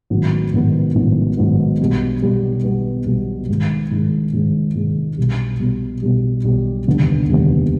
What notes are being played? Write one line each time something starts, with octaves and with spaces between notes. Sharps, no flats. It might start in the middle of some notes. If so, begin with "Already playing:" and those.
A1 G#2 D#3 F#3 B3
A1 G#2 D#3 F#3 B3
A1 G#2 D#3 F#3 B3
A1 G#2 D#3 F#3 B3
B1 B2 G3 B3
B1 B2 G3 B3
B1 B2 G3 B3
B1 B2 G3 B3
G#2 D#3 G#3
G#2 D#3 G#3
G#2 D#3 G#3
G#2 D#3 G#3
B1 B2 G3
B1 B2 G3
B1 B2 G3
B1 B2 G3
F1 D#2 D3 G3 B3
F1 D#2 D3 G3 B3